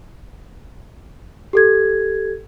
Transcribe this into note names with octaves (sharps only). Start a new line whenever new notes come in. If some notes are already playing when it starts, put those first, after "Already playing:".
G4 A4 G#6